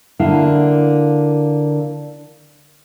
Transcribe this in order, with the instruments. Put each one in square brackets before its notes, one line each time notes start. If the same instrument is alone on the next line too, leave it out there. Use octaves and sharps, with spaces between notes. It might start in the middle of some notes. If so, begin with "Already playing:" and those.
[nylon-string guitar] D3 A#3 E4 F5